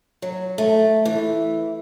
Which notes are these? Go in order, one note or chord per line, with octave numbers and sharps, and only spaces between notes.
F#3
A3
E3